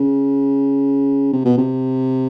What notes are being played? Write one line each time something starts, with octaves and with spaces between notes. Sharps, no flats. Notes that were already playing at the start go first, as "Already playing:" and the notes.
Already playing: C#3
C3
B2
C3